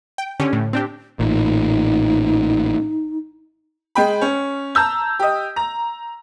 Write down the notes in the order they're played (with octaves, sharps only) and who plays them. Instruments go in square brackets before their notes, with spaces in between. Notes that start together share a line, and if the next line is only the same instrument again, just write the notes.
[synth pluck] G5
D3 C#4 G4
A2
C4 D4 G4
[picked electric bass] A1 A#2 [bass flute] D#4
[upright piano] G#3 G5 B5
C#4
A5 A#5 E6 G6
G4 D#5
A#5